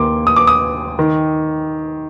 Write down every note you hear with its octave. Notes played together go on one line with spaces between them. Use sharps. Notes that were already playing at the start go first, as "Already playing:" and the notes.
Already playing: D#2 D#3 A#3 C6 D6
D#6
D6
D#6
D#3